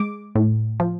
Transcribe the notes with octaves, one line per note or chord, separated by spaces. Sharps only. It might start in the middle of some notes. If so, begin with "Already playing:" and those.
Already playing: G#3 D6
A2
F3